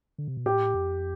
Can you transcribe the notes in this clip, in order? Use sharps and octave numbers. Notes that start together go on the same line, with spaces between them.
D3
C3
B2
A2 G4
F2